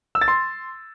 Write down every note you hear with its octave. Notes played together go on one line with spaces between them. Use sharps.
E6
A6
C6